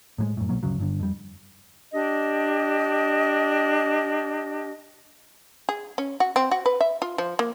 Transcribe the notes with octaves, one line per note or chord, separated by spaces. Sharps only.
A2 F#3 G#3
F#2 A2
B1 B2 F#3 A#3
D2 G2 C#3 F#3
G1 G2 D3
F2 G3
D4 G4 D#5
G#4
C#4
F#4
C4
F#4
B4
E5
F4
F3
A#3